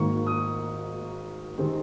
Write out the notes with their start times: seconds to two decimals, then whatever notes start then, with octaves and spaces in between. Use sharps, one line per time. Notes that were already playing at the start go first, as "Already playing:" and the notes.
Already playing: G#1 G#2 D#3 A#3 C#6
0.27 D#6
1.58 C3 D#3 G#3 C4